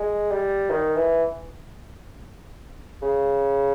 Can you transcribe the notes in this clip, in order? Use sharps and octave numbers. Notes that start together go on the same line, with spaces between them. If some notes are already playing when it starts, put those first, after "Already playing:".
Already playing: G#3
G3
D#3
E3
C#3